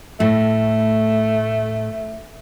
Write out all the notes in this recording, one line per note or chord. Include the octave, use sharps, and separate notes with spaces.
A2 A3